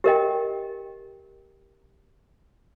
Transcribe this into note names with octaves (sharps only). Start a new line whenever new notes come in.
G4 A#4 D#5 G5